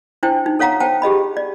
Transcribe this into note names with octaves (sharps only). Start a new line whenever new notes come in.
D4 E4 C5 G5
D#4
A4 C#5 F5 F#5 A#5
C5 F#5 G5 A5
G4 G#4 D#5 B5
D5